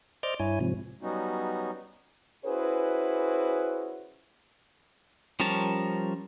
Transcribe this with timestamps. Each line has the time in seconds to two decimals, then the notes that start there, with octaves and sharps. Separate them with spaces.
0.23 C5 D5 D#5 D6 F6 G6
0.40 G2 E4 C#5 G#5
0.61 G#2 C3 F3
1.02 F#3 G3 B3 C#4 D#4 F#4
2.45 C#4 E4 F#4 G#4 B4 C5
5.40 F3 G3 C#4 A#4 A5